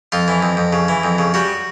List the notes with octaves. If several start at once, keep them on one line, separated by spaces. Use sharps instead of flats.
F2 F4
E3
F2
F2
C#3
E3
F2
C#3
G3 F#4